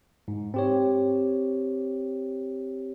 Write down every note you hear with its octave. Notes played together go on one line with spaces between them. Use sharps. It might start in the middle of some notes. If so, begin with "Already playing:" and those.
G#2
C4 G4 C#5